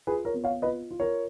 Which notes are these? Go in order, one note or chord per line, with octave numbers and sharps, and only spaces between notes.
F4 G#4 B4
A#4 C#5
B3
C#5 F5
F4 B4 D#5
F4
A#4 C#5